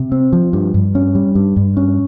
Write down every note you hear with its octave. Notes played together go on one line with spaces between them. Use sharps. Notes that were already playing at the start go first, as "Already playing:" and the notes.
Already playing: C3
C4
F3
G2
G2
C#4
G3
G2
G2
C#4